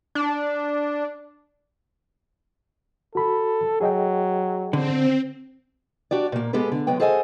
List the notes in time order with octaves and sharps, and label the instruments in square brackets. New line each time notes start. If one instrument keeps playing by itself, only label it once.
[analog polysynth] D4
[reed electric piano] F#4 B5 [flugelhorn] A4
[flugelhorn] F#3 [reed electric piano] G#4 D#5 G5
[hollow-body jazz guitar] D3 [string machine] C4
[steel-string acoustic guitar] D4 F#4 G4 D5
A#2 A#3
G#3 B3 G4 A4 B4
D3
F#3 G#3 B3 G5
G#4 A4 C5 D#5 F#5 G#5